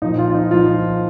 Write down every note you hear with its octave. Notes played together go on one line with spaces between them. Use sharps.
A#2 F3 D#4
F4
F4
D#4
A#2 F3 F4